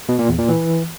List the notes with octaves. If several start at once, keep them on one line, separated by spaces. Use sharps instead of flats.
B2
A#2
E2
A#2
E3